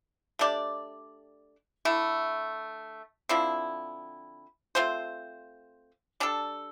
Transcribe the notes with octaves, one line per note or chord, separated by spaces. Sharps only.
A3 D4 G4 D5
D3 A3 E4
D3 F3 C4 E4
A3 C4 F4 C5
G3 D4 A4